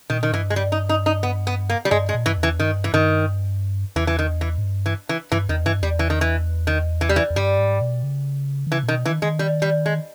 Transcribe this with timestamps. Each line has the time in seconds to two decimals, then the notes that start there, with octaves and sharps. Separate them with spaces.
0.10 A#2 D#3
0.23 D#3
0.33 G2 E3
0.50 G#3
0.56 G3
0.72 D#4
0.89 D#4
1.06 D#4
1.23 B3
1.47 B3
1.70 A#3
1.85 G3
1.91 G2 G#3
2.09 G#3
2.15 A#2
2.26 G2 E3
2.37 E2
2.43 E3
2.59 G2 D#3
2.84 E3
2.93 G2 D#3
3.96 E2 E3
4.07 E3
4.19 D#3
4.41 E3
4.58 G#2
4.64 G2
4.86 E3
5.09 E3
5.32 G2 E3
5.49 E2 D#3
5.65 G2 E3
5.82 E2 G3
5.99 E3
6.10 D#3
6.21 E3
6.67 D#3
7.01 E3
7.09 G3
7.16 E3
7.30 E2
7.36 G2 G3
7.58 G#2
7.81 B2
8.03 C#3
8.67 D#3
8.71 C#3 E3
8.83 A#2
8.88 B2 D#3
9.05 D#3 E3
9.22 D#3 G#3
9.39 G3
9.62 G3
9.86 G#3